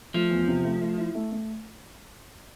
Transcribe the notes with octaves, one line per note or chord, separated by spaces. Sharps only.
F3 A3
E2
C3
A3
A3
E4
A3
A3